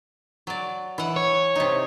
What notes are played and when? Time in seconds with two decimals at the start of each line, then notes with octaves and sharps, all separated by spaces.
0.47 F#3 D5
0.98 E3 F#5
1.16 C#5
1.55 C3 D#4